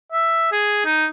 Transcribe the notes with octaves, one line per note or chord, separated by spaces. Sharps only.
E5
G#4
D#4